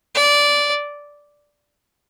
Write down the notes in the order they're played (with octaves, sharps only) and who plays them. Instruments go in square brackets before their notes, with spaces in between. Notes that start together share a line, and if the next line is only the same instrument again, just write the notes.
[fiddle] D5